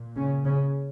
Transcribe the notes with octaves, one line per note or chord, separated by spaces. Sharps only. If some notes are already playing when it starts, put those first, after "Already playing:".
Already playing: A#2
C#3 C#4
C#3 C#4